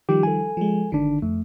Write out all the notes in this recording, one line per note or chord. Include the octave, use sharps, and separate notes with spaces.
D#3 F3 G3 G4
A4 G#5
F3 G#3
G1 D3 D#3 D4
F2 A3